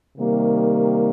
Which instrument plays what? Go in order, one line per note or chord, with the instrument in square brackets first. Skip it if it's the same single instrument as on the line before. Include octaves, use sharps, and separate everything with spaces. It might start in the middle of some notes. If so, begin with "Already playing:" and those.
[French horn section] C3 D#3 G3 A#3